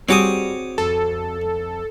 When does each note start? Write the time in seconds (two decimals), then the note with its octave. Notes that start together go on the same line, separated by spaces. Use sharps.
0.09 G3 C4 F#4 G#4 C#5 D6 D#6
0.78 F2 A4